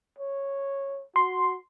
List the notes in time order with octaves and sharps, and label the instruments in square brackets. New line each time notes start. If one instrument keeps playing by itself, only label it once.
[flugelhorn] C#5
[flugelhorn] F#4 [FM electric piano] C6